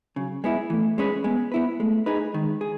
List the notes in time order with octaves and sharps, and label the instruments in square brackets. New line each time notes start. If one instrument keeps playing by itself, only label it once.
[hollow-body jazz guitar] C#3 [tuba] F#3
[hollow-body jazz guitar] G#3 B3 E4
[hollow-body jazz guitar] E3 [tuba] A3
[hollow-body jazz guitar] G#3 C#4 G#4 B4
[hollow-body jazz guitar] G#3 [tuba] B3
[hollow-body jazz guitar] B3 E4 B4
[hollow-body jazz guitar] G#3 [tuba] A3
[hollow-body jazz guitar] D#4 G#4 B4
[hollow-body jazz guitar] D#3 [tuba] G#3
[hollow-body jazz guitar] G#4